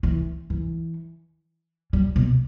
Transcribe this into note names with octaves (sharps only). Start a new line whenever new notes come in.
E3
E3
G3
B2